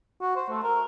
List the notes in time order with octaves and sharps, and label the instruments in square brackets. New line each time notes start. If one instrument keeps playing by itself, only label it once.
[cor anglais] F#4
C5
A3
A#4